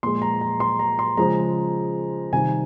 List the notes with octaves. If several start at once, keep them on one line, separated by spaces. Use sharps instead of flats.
A#2 F3 G#3 C6
A#5
A#5
C6
A#5
C6
C#3 F3 G#3 A#5
C3 D#3 G3 G#5